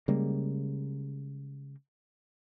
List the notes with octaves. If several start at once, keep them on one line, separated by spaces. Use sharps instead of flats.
C#3 G3 G#3 A#3